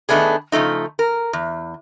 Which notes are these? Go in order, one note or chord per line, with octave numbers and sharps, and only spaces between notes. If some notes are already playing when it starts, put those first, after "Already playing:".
D#3 A3 B3 D4 G#4
C#3 F3 A3 D#4
A#4
E2